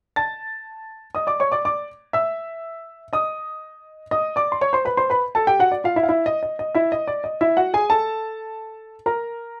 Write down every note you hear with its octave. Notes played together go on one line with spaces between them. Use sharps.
A5 A6
D#5 D#6
D5 D6
C#5 C#6
D5 D6
D5 D6
E5 E6
D#5 D#6
D#5 D#6
D5 D6
C6
C#5 C#6
C5 C6
B4 B5
C5 C6
B4 B5
A4 A5
G4 G5
F#4 F#5
D5
F4 F5
E4 E5
F5
E4 E5
D#5
D#5
D#5
E4 E5
D#5
D5
D#5
E4 E5
F#4 F#5
G#4 G#5
A4 A5
A#4 A#5